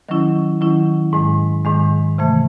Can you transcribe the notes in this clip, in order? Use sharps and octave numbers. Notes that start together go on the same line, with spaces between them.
D#3 F#3 C#4 E4
D#3 F#3 C#4 E4
G#2 D#3 G#3
G#2 D#3 G#3
C3 E3 A3